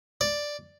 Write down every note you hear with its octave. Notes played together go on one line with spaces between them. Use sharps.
D5